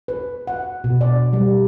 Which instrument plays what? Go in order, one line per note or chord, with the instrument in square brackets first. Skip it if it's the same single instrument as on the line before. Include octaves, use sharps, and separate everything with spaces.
[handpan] B4
F#5
B2
D5
G3